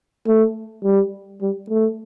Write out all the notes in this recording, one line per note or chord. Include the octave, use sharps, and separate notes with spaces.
A3
G3
G3
A3